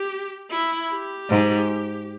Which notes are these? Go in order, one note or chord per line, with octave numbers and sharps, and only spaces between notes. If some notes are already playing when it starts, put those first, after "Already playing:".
Already playing: G4
E4
G4
G#2